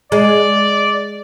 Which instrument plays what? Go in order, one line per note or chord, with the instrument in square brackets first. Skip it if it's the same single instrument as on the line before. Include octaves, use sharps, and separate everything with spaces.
[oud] G#3 [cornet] D5